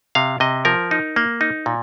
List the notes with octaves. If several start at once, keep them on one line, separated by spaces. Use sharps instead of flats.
C3 F5
C3 D#5
F3 A#4
D#4
A#3
D#4
A#2